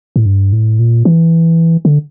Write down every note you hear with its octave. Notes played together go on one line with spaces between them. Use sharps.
A2
G2
A2
A#2
E3
D3